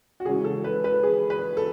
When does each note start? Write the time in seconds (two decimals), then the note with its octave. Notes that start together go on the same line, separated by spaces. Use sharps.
0.20 F#4
0.25 C#3 G#3 C#4 E4 G#4
0.44 A4
0.64 B4
0.84 B4
1.03 G#4
1.30 B4
1.57 A4